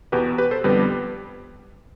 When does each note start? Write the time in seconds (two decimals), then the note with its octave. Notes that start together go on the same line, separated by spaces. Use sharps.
0.12 E2 B2 B3 G4 B4
0.38 G4 B4
0.51 A4 C5
0.64 F2 D3 G3 B3 G4 B4